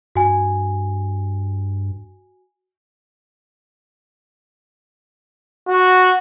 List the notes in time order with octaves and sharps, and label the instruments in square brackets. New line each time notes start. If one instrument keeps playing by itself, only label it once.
[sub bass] G2 [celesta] F#4 G#5
[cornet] F#4